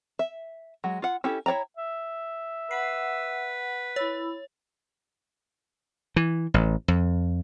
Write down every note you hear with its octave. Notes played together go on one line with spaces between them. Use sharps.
E5
F#3 G#3
F4 F#5
C#4 E4 G4 A4
E4 C#5 D5 G5 A#5
E5
B4 F#5 C7
E4 C#5 B5 E6
E3
A1
F2